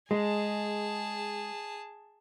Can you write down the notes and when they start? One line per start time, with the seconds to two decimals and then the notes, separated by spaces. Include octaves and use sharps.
0.11 G#3 G#4 A5